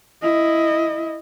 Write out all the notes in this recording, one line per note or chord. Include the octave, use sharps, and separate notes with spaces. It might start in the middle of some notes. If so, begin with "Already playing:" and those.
E4 D#5